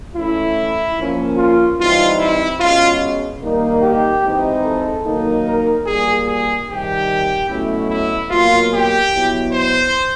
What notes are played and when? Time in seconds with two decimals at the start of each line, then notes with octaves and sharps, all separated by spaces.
0.15 E3 A3 C#4 E4
0.97 A#2 F3 A#3 C#4
1.37 F4
1.78 E3 G3 C4 D#4 F4
2.19 E4
2.60 B2 G#3 C#4 F4
3.41 D#3 G3 A#3 D#4
3.82 G4
4.23 E3 G#3 C4 D#4
4.63 A4
5.05 D#3 F#3 A#3 D#4
5.45 A#4
5.86 A#2 G3 A#3 G#4
6.27 G#4
6.68 C3 D#3 G3 G4
7.49 B2 F#3 A3 C#4 E4
7.90 E4
8.31 B2 F#3 A#3 F4
8.71 G4
9.12 B2 F#3 B3 E4
9.53 C5